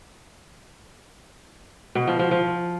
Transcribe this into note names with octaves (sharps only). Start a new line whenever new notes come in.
B2
F3
F3
F3